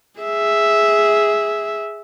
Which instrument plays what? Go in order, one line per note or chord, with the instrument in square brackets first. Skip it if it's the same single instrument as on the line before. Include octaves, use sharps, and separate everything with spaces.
[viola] G#4 E5